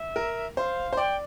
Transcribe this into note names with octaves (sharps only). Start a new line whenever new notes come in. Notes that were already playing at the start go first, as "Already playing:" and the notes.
Already playing: E5
A#4
C5 F5
C5
D5 G5